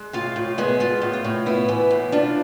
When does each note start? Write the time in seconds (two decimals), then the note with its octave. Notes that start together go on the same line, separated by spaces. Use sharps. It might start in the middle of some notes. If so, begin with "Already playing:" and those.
Already playing: G#3
0.13 A2 F4 F5
0.36 A2
0.58 G#3 B3 G#4
0.80 G#3 F4
1.02 A2
1.13 F4
1.24 A2
1.46 B3 E4
1.68 E3
1.91 A2
2.12 D4 F4